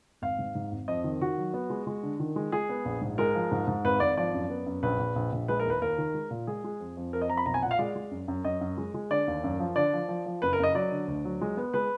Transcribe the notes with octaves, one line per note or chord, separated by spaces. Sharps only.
G#1 F5
G#2
G#2
G#1
F2 D#5
D#3
D#3 F#4
F#3
B3
G#3
G#3
D3
D#3
G#3
G#3 G#4
B3
A#1
G#2
G#3 A#4
F3
G#2
G#2
G#1 B4
G#1 D5
F3 D5
F#2
B3
F#2
A#1 B4
A#1
A#1
A#1
G#3 B4
A#4
D#2 B4
D#2 A#4
D#3
G#3
A#2
G#3 G#4
G#3
F2
F2
F2 A#4
D#5
F2 A#5
B5
B1 A#5
G#5
A#2 F#5
F5
G#3 D5
G#3
F#2
F#2
F#2 D#5
F#2
G#3
G#3
D3 D5
D#2
F#2
F3
D3 D5
F3
F3
F3
F#1 B4
A#4
F#1 D#5
F#3 D5
D3
D2
F#3
G#3
B3
G#3 B4